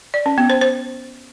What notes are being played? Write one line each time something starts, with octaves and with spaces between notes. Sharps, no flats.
D5
C#4
B3
C5
C5